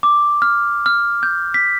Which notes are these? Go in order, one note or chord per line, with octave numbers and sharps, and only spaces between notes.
D6
F6
F6
G6
B6